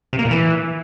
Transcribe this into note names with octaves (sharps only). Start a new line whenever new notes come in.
C3
A#3
A#2
E3